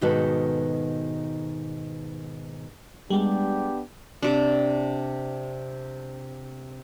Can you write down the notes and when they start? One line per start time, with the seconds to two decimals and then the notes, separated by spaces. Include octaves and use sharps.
0.01 G#2 B2 D#3 F#4 A4 B4
3.10 G3 G#3 B3 D4 G4
4.23 C3 D4